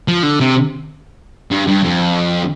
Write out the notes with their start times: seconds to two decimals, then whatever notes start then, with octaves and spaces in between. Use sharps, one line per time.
0.08 F3
0.23 D3
0.40 C3
1.51 G2
1.67 G2
1.83 F2